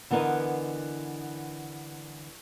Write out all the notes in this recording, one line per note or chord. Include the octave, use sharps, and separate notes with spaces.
D3 E3 B3 A#4 D#5